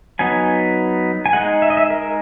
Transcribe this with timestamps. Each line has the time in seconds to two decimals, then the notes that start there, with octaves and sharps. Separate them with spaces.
0.19 F#3 B3 D#4 G#5
1.26 G#5
1.33 G#3 D#4 F#5
1.62 E5
1.70 D#5
1.77 E5
1.90 A#4